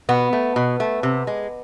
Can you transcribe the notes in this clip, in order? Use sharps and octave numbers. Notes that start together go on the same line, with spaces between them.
B2 B3
A3
B2
A3
C3
G#3